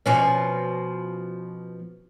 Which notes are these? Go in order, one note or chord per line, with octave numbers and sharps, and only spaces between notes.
B2 F3 C#4